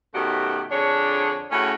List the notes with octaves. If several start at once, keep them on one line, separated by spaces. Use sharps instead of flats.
B2 D#3 A3 C#4 F#4 G4
F2 D3 D4 G#4 C#5
A2 C#3 C#4 F#4 C#5